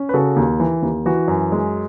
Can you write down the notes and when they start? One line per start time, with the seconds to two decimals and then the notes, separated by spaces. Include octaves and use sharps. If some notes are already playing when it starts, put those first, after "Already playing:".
Already playing: C#4
0.09 B4
0.13 C#3 F#4 A4
0.36 D#2
0.60 E3
0.82 D#2
1.06 E3 F#4
1.28 F#2
1.52 G#3